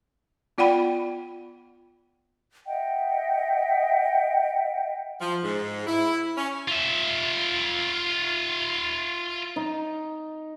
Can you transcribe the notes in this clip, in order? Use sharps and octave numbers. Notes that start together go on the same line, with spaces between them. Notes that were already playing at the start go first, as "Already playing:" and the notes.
B3 F4 D5 F#5 G5 B5
D#5 E5 F#5 G5
F3
G#2
E4
C#4
F4 E5
D#4